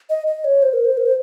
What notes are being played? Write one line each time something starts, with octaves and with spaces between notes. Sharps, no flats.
D#5
D#5
C#5
C5
A#4
C5
A#4
C5